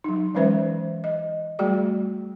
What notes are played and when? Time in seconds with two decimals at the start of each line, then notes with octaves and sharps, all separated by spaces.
0.04 F#3 D#4
0.35 E3 G#3 C#4 B4 C5 E5
1.04 D#5
1.59 G3 A3 F#4 G#4 D5